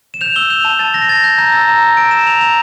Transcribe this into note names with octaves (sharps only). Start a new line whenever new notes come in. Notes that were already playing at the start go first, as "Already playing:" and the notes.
E7
G6 F7
E6 G7
G6 F7
A5
A5 A6
G6 A#6
A#6
A5 A6
G6
A#5 G6
E6 A6
A#5 A#6
G6
E6 D7
E6 E7
A#5 F7
A#5 F7